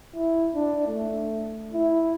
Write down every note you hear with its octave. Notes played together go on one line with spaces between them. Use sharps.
E4
D4
A3
E4